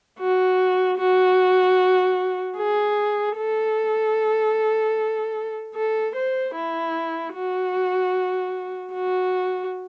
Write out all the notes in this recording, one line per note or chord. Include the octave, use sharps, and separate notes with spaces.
F#4
F#4
G#4
A4
A4
C5
E4
F#4
F#4